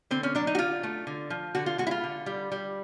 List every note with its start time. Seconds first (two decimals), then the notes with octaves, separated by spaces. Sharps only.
0.11 D3 C4
0.23 C#4
0.35 F#3 D4
0.47 D#4
0.55 F#4
0.58 D3 F4
0.83 A3
1.07 D3
1.30 F3
1.55 D3 F#4
1.66 F4
1.78 G#3 F#4
1.87 E4
1.91 F4
2.04 D3
2.26 G3
2.52 G3